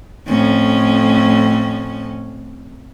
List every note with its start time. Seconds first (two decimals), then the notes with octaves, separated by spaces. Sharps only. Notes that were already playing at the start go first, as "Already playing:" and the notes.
0.27 F2 A2 C#4